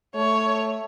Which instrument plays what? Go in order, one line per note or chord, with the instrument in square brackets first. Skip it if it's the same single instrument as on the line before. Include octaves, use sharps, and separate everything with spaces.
[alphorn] A3 [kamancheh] C#5